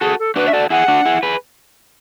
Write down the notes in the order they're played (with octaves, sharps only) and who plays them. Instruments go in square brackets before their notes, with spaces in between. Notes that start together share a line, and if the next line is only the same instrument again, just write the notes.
[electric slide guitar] F#4 A4 [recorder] G#4
[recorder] A4
[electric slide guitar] D4 F#4 [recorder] B4
[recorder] E5
[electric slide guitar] F#4 A4 [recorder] D5
[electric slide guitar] E4 G#4 [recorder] F#5
[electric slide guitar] D4 F#4
E4 G#4
G#4 B4